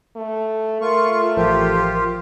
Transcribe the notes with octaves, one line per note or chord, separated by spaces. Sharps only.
A3
A3 F4 A#4 C#6
A1 F3 F4 G4